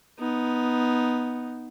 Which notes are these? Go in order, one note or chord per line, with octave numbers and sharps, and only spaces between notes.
B3 D#4